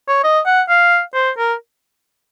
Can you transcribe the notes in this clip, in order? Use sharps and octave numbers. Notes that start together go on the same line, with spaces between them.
C#5
D#5
F#5
F5
C5
A#4